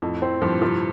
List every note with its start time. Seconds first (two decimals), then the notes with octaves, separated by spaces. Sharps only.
0.02 F2 A2
0.22 A2 C4
0.42 G2 A#2 F3
0.61 A2 C3 F3